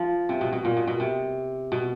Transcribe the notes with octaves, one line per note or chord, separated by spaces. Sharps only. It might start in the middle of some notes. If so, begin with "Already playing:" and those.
Already playing: F3
C3
B2
B2
A#2
B2
B2
C3
B2